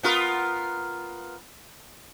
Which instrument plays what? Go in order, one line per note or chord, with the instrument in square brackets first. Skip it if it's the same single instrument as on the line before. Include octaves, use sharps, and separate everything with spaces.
[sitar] B3 F4 A#4